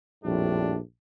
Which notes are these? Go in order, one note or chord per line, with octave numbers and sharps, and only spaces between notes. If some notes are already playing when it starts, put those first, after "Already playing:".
A#1 F2 A2 G3 D4